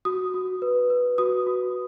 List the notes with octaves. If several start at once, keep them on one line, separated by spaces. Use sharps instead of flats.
F#4 D#6
F#4
B4
B4
F#4 D#6
F#4